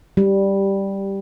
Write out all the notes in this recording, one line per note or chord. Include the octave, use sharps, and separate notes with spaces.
G3